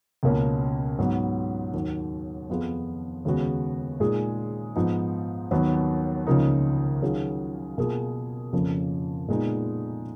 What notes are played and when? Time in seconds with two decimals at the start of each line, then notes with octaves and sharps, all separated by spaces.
0.23 C#2 B2 A#3 C#4
0.99 G#2 F#3 B3
1.74 D#2 D#3 F#3
2.49 F2 F3 B3 F4 G#4
3.25 D#2 C#3 G#3 B3 F#4
4.00 A#2 G#3 D#4 G#4
4.76 G#2 F3 B3 D#4
5.51 D#2 D#3 F#3 B3
6.27 C#2 C#3 F3 A#3 D#4
7.02 D#3 F#3 C#4 F4 G#4
7.78 B2 A#3 F4 G#4
8.53 F2 C#3 F3 A#3 C#4
9.28 A#2 G#3 B3 D#4